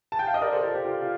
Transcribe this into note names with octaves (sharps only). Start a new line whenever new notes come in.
A5
G5
F5
D#5
A#4 D5
A4 C5
F4 A4
G4
F4
F4